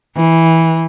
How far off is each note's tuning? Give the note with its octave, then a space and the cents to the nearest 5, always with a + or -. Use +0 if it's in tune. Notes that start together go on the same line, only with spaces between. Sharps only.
E3 -10